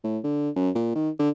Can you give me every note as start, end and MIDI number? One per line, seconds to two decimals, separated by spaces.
0.04 0.19 45
0.24 0.50 50
0.56 0.70 42
0.75 0.91 46
0.95 1.10 51
1.19 1.29 50